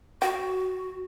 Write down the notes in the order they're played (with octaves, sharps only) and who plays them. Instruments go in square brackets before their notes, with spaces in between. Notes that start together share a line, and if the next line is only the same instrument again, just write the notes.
[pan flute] F#4 [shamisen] G5